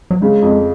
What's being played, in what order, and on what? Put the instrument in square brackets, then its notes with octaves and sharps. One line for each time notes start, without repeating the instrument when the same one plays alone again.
[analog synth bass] F#3
[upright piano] C#3 [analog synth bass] G#3
[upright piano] F2